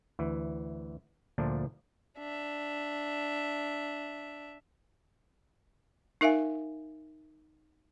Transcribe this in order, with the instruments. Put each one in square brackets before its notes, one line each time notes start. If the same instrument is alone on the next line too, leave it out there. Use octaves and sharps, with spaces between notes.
[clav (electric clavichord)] D2 E3
D2 A#2 D3 F3 D4
[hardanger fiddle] D4 E5
[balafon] D#4 A#4 E5 F5 G#5